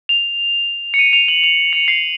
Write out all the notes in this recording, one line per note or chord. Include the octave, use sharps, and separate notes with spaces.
F7
C#7
D#7
F7
F#7
F7
C#7
C7